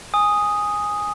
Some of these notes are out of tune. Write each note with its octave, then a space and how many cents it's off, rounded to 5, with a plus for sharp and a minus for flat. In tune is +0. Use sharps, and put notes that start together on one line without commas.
G#5 -10 D#6 +0